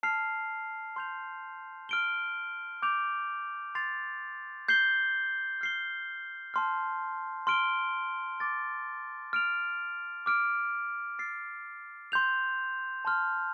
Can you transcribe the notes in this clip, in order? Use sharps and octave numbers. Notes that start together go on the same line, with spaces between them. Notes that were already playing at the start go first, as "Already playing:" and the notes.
A5 F6 C7 F7
C6 G6 F7
F6 D7 G7
D6 G6 D7 F7
C6 A6 C7 F7
G6 C7 G7
F6 C7 G7
A5 C6 F6
C6 F6 D7 G7
D6 A6 D7
F6 D7 F7
D6 F6 D7
F6 A6 C7
C6 G6 F7
A5 C6 F6